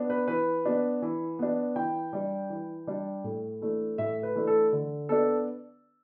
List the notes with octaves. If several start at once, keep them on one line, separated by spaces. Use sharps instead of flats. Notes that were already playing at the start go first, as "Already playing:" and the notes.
Already playing: B3 D4
B4
E3 B4
B3 D4
E3
B3 D4
E3 G5
G3 D4
E3
G3 D4
A2
E3 A3 D4
A2 E5
B4
E3 A3 D4
A4
D3
B3 D4 A4